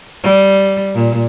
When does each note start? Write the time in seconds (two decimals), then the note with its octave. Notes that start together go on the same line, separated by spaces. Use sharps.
0.23 G3
0.95 A#2